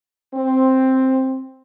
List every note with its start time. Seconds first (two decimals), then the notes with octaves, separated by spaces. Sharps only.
0.34 C4